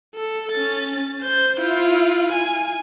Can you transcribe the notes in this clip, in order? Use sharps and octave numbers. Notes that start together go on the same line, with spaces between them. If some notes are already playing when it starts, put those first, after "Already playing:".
A4
C#4 A6
C5 G6
E4 F4
G#5